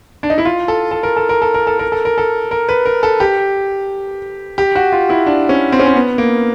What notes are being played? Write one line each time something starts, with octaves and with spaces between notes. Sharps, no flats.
D4
D#4
E4
F4
A4
A4
A#4
A4
A#4
A4
A#4
A4
A#4
A4
A#4
A4
A#4
B4
A#4
A4
G4
G4
F#4
F4
E4
D4
C#4
C4
C#4
C4
B3
A#3